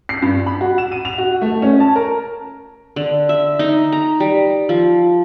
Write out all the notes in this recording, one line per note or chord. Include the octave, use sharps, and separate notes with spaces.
C7
G2
B5
F#4
E7
D#7
F7
F#4
A3
C#4
A5
A#4
D3
E5
D#4
A#5
G3
F3